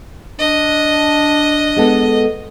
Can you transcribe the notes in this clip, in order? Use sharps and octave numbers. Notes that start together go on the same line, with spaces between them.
D4 D#5
G#3 B3 A4